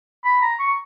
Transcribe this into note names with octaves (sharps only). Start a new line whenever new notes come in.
B5
A#5
C#6